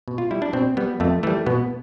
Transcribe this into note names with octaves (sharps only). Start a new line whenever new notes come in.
B2
F4
G3 E4
D4
B2 C4
G3 B3
F2 A3
E3 G3 A3
B2 B3